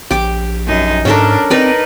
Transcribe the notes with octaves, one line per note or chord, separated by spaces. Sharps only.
A#1 G4 D6
F#2 D#4
G#2 C#4 D4 A4 A#4
C4 D#4 A#4 B4 D5